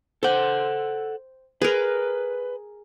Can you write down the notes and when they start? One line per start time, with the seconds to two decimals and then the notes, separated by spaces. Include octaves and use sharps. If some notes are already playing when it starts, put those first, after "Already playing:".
0.23 A4 C5 F#5 G5
1.62 G#4 A#4 B4